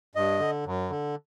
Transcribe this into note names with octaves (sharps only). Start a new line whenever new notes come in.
G2 D#5
D3
F#2
D3